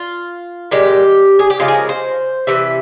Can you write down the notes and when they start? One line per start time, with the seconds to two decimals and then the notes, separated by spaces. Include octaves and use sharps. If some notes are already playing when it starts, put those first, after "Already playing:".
Already playing: F4
0.71 A#2 G#3 G4
1.39 G#4
1.50 G4
1.60 C#3 F3 G#3 F4
1.68 G#4
1.74 A#4
1.89 C5
2.47 C3 E3 E5